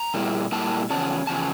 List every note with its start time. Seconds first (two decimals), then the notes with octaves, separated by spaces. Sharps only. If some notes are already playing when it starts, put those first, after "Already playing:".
Already playing: A#5
0.14 A#2 G3 A#3 E4
0.52 A#2 G3 A#3 E4 A5
0.90 E2 C#3 F3 C#4 A5
1.27 E2 C#3 F3 C#4 A5